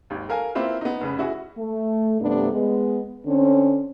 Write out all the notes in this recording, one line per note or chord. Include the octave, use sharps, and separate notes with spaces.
G#1 D#2
A4 A#4 F5 G#5
A#3 C4 E4 F4 B4
B3 D#4
F1 C#3 B4
E4 F#4 G#4
A3
G2 C3 A3 B3 D4
G#3 B3
D3 C4 C#4